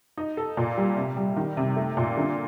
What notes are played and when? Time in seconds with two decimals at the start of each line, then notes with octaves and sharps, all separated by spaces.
0.17 D#4
0.37 A4
0.57 A#2
0.77 G3
0.97 C3
1.17 G3
1.37 D#3
1.57 C3
1.77 A3
1.97 A#2
2.17 D3